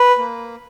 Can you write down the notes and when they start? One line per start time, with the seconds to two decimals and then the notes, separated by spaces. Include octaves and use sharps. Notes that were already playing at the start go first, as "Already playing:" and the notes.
Already playing: B4
0.18 A#3